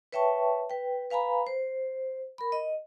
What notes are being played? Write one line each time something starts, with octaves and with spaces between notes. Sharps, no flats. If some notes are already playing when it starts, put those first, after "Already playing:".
B4 C#5 E5 G5 A5 C#6
B4 G5
B4 F5 G#5 A#5 B5
C5
A#4 B5
D#5